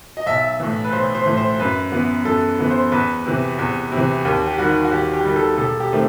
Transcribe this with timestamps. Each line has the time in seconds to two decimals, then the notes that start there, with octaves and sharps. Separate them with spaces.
0.17 D#5
0.26 B1 E5
0.60 A2 E3
0.84 B4
0.92 B1 C5
1.15 C5
1.26 A2 E3
1.37 C5
1.60 F#2 B4
1.92 E3 B3
2.25 F#2 A4
2.59 E3 B3
2.71 C5
2.92 E2 B4
3.26 C3 E3
3.59 E2
3.92 C3 E3
4.25 D#2 G4
4.47 G4
4.58 D#3 G3 F#4
4.85 F#4
4.91 D#2 G4
5.13 G4
5.24 D#3 G3
5.36 A4
5.58 E1 A4
5.80 G4
5.92 D#3 A3 C4